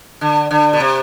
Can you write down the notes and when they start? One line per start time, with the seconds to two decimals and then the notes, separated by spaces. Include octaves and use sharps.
0.21 D3
0.51 D3
0.73 B2
0.80 C3